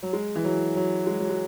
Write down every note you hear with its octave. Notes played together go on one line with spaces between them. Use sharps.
F#3
G#3
E3
F#3
F#3
G#3
F#3
G#3